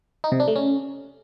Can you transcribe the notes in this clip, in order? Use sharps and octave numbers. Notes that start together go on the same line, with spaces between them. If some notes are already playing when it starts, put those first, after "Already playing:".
D#4
C3
D4
A3
C#4